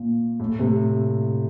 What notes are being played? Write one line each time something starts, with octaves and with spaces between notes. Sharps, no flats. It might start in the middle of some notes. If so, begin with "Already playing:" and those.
Already playing: A#2
A2
C3